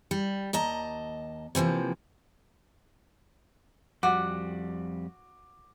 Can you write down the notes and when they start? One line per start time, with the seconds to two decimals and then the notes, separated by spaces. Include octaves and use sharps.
0.11 G3
0.53 D#2 D#5 A5 A#5
1.55 C3 E3 F3 A#3
4.03 F2 G3 F#4 D6